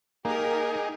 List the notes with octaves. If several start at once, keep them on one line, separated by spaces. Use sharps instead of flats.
A#3 D#4 G4 G#4 A#4